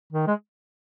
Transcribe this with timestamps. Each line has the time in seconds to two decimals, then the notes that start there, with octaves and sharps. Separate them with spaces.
0.13 D#3
0.27 G#3